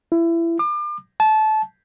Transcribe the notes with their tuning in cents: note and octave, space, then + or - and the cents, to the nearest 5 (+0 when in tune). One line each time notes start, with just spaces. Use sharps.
E4 +25
D6 +35
A5 -20